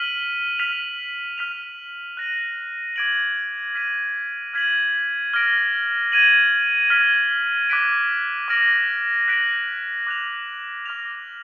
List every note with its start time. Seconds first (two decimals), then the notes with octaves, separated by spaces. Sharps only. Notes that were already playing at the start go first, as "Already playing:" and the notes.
Already playing: F6 B6 D#7 F#7
0.59 F6 B6 F7
1.38 F6 B6 F7
2.17 F#6 A#6 D#7 F#7
2.96 D6 G#6 D7 F#7
3.74 F6 B6 D#7 F#7
4.54 F6 G#6 B6 D#7 F#7
5.33 D6 F6 A#6 D7
6.12 G#6 D#7 F#7
6.90 F6 G#6 B6
7.70 D6 F#6 B6 D7
8.48 D6 F6 A#6 D7 F#7
9.28 F#6 B6 D7 F#7
10.07 D6 F#6 A#6 F7
10.86 D6 F6 A#6 F7